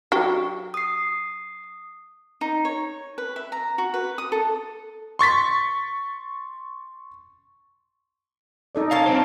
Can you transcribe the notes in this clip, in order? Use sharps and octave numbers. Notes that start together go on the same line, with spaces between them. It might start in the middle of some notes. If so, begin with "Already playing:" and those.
F#3 G4
D#6 C7
D#4
C#5
B4
E5
A#5
F#4
B4
D#6
A4
C6 C#6 A6 B6
D#4 A4 D5
A#2 C#4 F5 A5
C4 D4 C5